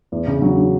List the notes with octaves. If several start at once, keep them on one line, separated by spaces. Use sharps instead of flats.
E2
C#3
F#3
F#3